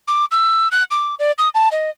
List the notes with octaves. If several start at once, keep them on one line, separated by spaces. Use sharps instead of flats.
D6
E6
F#6
D6
D5
D#6
A5
D#5